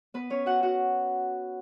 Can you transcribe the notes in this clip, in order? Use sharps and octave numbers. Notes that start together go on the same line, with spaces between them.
B3 B4
C#4 C#5
F#4 F#5
F#4 F#5